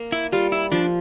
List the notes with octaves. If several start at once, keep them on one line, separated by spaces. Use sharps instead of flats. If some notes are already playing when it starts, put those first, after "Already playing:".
Already playing: A#3
E4
G3 F4
E4
F3 D4